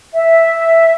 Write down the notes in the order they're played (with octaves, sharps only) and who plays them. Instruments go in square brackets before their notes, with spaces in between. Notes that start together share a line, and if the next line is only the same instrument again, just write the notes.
[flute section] E5